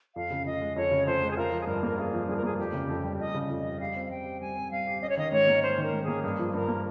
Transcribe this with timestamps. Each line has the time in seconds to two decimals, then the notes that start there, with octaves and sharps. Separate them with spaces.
0.15 F2 F5
0.31 C#3
0.46 F2 D#5
0.61 G#3
0.76 F2 C#5
0.91 C#3
1.06 F2 C5
1.22 G#3
1.31 G#4
1.37 F4 A#4
1.52 F3
1.61 G#4
1.67 G2 A#4
1.83 A#3 A#4
1.98 F4 G#4
2.13 F3
2.28 G2 G#4
2.36 A#4
2.43 A#3 G#4
2.58 F2 G4
2.73 C#3
2.89 F2
3.04 G3
3.19 F2 D#5
3.34 C#3
3.50 F2
3.60 D#5
3.65 G3
3.80 G3 F5
3.95 C4
4.06 F5
4.11 G3 G5
4.26 G4
4.41 G3 G#5
4.56 C4
4.71 G3 F5
4.87 G4
5.02 C#4 D#5
5.09 C#5
5.17 D#3 D#5
5.32 G#2 C#5
5.48 A#3
5.63 C#4 C5
5.78 D#3 A#4
5.93 G#2
6.03 A#3 G#4
6.24 G2 G#4
6.39 F3
6.54 G2 A#4
6.69 A#3